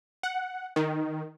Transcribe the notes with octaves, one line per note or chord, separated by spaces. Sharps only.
F#5
D#3